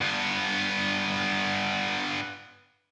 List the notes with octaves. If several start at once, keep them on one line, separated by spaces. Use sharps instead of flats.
G2 B3